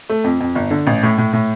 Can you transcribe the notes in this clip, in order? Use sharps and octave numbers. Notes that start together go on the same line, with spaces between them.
A3
F2
F2
G1
D3
A1
A2
A2
A2